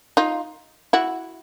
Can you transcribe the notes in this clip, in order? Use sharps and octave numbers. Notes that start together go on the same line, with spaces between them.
D#4 F4
E4 F#4